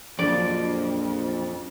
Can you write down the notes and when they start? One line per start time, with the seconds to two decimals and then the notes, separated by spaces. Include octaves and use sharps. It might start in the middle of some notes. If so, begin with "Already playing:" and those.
0.19 A#1 F2 F#3 D4 F4 D5